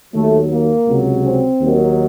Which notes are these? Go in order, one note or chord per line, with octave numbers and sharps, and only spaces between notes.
D#2 D#3 F#3 A3
A#3
C#2 C3 F#3
C4
D#2 D#3 F#3